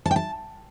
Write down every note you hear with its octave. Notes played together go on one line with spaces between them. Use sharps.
A5
G5
A5